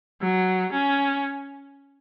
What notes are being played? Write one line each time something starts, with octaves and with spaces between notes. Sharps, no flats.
F#3
C#4